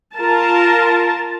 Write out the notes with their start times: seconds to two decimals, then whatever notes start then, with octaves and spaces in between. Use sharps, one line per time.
0.16 F4 A#4 A5